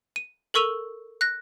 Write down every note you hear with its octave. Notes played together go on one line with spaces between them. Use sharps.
D#7
A4 A#4 C#6 E6 D#7 F7
F#6 A#6